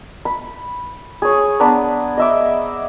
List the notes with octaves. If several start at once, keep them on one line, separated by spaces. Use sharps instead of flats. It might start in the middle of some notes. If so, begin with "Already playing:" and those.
B5
G#4 C#5
B3 D4 A#5 B5
D#5 E5 D6